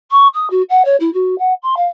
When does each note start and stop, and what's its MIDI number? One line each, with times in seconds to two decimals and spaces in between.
0.11 0.27 85
0.34 0.49 87
0.50 0.62 66
0.69 0.82 78
0.85 0.96 73
1.00 1.11 64
1.13 1.37 66
1.38 1.53 78
1.62 1.74 84
1.76 1.86 77